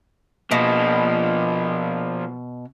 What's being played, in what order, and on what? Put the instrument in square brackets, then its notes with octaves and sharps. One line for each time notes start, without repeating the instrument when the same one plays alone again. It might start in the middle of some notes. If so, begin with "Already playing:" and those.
[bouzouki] B2 [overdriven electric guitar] F3 A#3